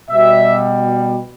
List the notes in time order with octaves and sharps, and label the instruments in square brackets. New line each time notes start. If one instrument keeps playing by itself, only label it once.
[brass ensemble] B2 G3 E5